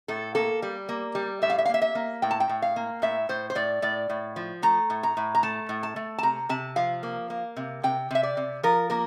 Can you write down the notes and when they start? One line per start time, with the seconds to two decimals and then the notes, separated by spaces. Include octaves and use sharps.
0.08 A2 A4
0.35 A#3 A4
0.62 G3
0.89 A#3
1.15 G3
1.42 A2 E5
1.50 F5
1.58 E5
1.65 F5
1.69 A#3 E5
1.82 E5
1.95 A#3
2.22 A2 G5
2.31 A5
2.40 G5
2.49 A2
2.62 F5
2.76 A#3
3.02 A2 E5
3.29 A2 C5
3.50 C5
3.55 A2 D5
3.82 A2 D5
4.10 A2
4.36 F3
4.62 A3 A#5
4.90 A2
5.03 A#5
5.17 A2
5.35 A#5
5.43 A3 A5
5.69 A2
5.83 A5
5.96 A3
6.18 A5
6.23 C3 A#5
6.49 C3 A5
6.76 F3 F5
7.03 A#3
7.30 A#3
7.57 C3
7.83 C3 G5
8.11 C3 E5
8.23 D5
8.37 C3
8.63 F3 A#4
8.90 A#3 A#4